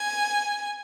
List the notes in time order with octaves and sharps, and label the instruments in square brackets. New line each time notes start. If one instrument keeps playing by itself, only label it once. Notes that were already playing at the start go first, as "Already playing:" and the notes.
Already playing: [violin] G#5